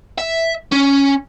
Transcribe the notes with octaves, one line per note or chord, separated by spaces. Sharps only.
E5
C#4